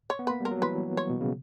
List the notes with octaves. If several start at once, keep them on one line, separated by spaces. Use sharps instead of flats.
C#5
B3
A#3 B4
G3 A#4
F#3
E3 B4
C#5
B2
C#3